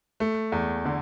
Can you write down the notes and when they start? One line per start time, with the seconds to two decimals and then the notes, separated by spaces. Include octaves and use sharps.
0.20 A3
0.52 E2
0.85 D3